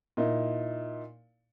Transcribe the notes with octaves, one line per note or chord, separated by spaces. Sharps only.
A#2 D#4 E4